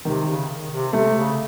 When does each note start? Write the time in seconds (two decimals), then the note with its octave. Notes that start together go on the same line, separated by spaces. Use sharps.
0.05 C3 D#3
0.27 C#3
0.48 D#3
0.71 C3
0.93 C3 A3
1.15 C#3